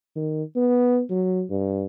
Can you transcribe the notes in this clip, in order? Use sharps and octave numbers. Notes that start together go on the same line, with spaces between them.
D#3
B3
F#3
G2